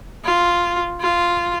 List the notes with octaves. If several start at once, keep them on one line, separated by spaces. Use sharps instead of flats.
F4
F4